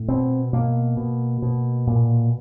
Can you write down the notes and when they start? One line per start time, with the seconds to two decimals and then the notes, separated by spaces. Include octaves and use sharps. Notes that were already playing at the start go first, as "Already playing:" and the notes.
Already playing: A2
0.08 B2 C4
0.53 B2 A#3
0.97 B2
1.42 B2
1.87 A#2